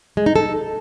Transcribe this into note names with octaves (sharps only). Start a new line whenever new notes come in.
G#3
D#4
A4